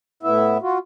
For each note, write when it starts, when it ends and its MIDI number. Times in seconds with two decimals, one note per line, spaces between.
0.23 0.58 45
0.23 0.58 59
0.23 0.58 64
0.23 0.58 76
0.62 0.78 65
0.62 0.78 66